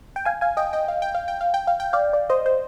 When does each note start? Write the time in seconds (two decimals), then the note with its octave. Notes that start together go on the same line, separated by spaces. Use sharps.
0.16 G5
0.25 F5 G#5
0.41 F5 G#5
0.57 D#5 G5
0.73 D#5 G5
0.88 F5
1.02 G5
1.15 F5
1.28 G5
1.41 F5
1.54 G5
1.67 F5
1.80 G5
1.93 D5 F5
2.13 D5
2.29 C5 D#5
2.46 C5